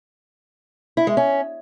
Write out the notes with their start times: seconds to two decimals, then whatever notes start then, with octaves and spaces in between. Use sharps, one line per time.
0.97 E4
1.07 G#3
1.17 C#4